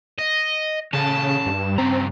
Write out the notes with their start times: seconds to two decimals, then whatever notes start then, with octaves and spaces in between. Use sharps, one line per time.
0.19 D#5
0.93 C#3 C#4 A4 A5
1.46 G2
1.78 G2 C#3 C4 A#5